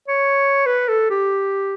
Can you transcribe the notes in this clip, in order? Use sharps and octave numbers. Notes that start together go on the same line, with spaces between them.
C#5
B4
A4
G4